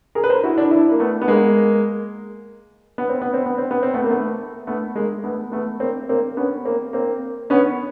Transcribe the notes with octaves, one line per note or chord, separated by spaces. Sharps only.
G#4 A#4
B4
A#4 C5
E4 F#4
D4 E4
D4 E4
A#3
A3 B3
B3
G#3 A#3
B3
C4
B3
C4
B3
C4
B3
C4
A3 B3
A#3
A3 B3
A3 B3
G#3 A#3
A3 B3
A3 B3
A#3 C4
A#3 C4
B3 C#4
A#3 C4
A#3 C4
B3 C#4